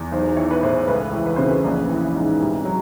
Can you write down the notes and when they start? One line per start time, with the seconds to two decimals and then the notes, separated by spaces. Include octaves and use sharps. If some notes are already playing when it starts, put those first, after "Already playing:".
Already playing: E2
0.12 B1 C5
0.37 E3 C#5
0.51 B4
0.62 A2 C5
0.88 C#2 B4
1.13 E3
1.26 B4
1.36 C#3 C5
1.48 B4
1.64 A#1
1.89 E3
2.14 G#2
2.40 C2
2.65 F#3